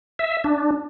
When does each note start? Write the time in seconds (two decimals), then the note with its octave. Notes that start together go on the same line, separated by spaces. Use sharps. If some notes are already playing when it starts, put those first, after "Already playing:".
0.19 E5
0.44 D4